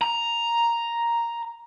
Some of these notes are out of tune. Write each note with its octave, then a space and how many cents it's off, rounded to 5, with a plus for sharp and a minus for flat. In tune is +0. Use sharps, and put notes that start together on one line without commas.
A#5 +5